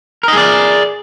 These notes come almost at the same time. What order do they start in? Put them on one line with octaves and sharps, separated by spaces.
A#4 D#5 G#4 D5